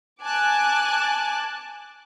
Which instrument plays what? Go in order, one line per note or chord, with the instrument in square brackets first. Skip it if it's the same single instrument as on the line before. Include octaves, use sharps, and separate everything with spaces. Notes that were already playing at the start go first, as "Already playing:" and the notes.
[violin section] G#5 A5 D6 F#6